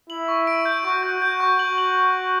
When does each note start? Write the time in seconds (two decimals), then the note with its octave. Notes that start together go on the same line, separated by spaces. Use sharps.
0.09 E4 F#7
0.28 C#6
0.47 D7
0.65 G6
0.84 F#4 C#6
1.03 G6
1.22 F#4 G6
1.40 C#6
1.59 F#4 F#7
1.78 F#7